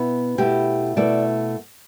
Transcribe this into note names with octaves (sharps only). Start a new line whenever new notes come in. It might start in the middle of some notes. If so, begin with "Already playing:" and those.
Already playing: B2 B3 E4
B2 A3 E4 G4
B2 A3 E4 D5